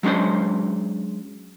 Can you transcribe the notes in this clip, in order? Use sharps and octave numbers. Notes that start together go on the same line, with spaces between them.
F#3 G#3 C#4 D4 C5